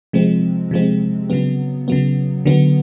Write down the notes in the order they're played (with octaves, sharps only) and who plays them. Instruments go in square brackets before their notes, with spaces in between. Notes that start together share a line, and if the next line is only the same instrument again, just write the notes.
[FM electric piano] C3 F3 G#3 C4
C3 F3 G#3 C4
C#3 F#3 B3
C#3 F#3 B3
D3 F#3 B3